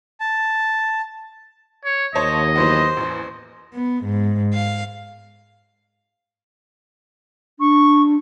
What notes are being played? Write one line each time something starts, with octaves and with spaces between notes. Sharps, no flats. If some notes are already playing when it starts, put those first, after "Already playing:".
A5
C#5
D#2 C5 C#5 D#5 A5
E3 F#3 B3 C5
A1 E2
B3
G#2
F5
D4 C#6